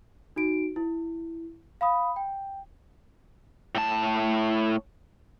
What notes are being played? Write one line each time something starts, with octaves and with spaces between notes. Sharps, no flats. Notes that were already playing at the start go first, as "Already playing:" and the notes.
D#4 F#4 D7
E4
F5 B5 D#6
G5
A2 A5